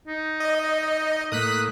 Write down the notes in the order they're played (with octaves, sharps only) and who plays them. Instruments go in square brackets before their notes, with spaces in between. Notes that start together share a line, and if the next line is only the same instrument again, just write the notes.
[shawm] D#4
[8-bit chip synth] D#5
[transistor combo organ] A2 A#3 [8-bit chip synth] D#6 F#6 B6